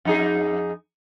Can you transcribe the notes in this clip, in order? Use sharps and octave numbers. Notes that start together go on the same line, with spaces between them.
F2 D#4 G#4